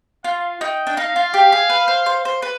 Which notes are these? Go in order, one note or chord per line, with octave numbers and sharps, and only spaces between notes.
F4 F5
D#4 G5
D4
D#4 F5
F4
G4
G#4
B4
C5
C5
C5
B4